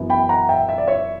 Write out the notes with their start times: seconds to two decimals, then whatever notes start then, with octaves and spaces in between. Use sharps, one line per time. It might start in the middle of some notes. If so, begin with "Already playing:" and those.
Already playing: F#2 E3 B3
0.10 G5 B5
0.29 F#5 A#5
0.49 E5 G5
0.69 E5
0.78 D5
0.87 C#5 E5